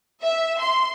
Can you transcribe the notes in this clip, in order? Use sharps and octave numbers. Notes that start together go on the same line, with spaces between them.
E5
C6